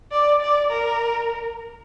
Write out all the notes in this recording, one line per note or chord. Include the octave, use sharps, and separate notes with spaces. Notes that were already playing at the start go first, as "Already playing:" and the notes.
D5
D5
A#4